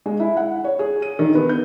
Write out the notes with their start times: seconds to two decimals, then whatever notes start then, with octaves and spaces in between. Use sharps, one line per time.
0.06 G#3
0.20 E4
0.37 F#5
0.64 C#5
0.79 G#4
1.02 D#7
1.19 D#3
1.35 B3
1.49 G6